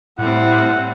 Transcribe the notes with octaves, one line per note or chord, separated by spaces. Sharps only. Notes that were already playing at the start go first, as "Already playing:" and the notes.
A2 G3 C4 E4 F#5